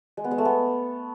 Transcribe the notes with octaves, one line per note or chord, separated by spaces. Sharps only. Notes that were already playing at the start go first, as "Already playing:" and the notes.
G#3
B3
G#3
A3
B3